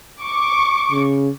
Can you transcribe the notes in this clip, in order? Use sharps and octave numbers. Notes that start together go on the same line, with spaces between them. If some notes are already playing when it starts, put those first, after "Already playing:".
C#6 D6
C#3